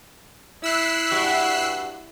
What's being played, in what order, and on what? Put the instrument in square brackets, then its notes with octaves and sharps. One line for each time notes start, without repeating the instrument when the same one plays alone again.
[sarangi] E4 [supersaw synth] E6 F#6 C7
[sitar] G2 F#4